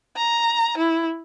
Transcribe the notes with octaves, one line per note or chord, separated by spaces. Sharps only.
A#5
E4